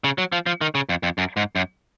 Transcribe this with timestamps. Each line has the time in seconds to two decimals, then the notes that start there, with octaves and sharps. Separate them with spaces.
0.04 C#3
0.18 F#3
0.32 F3
0.46 F3
0.61 D#3
0.75 C#3
0.89 F2
1.03 F2
1.18 F#2
1.37 G#2
1.56 F#2